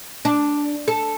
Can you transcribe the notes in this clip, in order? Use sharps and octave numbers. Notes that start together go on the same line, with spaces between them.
D4
A4